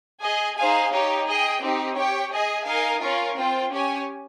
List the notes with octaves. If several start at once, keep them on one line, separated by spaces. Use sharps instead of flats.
G#4 D#5 G#5
D#4 G#4 C5 F5 G#5
D#4 G4 C#5 G5
G#4 D#5 G5
C4 D#4 G4
G4 C#5 G5
G#4 D#5 G#5
D#4 A#4 F5 G#5
C#4 F4 A#4 C#5 F5
C4 F4 C5 G5
C#4 G4 C#5 G#5